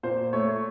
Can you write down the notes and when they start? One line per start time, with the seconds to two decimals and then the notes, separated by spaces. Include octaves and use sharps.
0.03 A#2 C5
0.33 A3 C#5